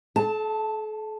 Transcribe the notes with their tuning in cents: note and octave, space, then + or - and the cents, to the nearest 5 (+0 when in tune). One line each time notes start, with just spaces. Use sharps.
A4 -40 A5 +0